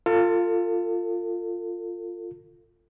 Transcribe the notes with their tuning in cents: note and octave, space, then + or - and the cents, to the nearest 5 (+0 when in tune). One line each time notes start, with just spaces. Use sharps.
F4 +0 A4 +35